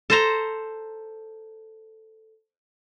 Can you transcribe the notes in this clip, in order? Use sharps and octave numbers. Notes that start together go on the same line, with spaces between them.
A4 C5 A#5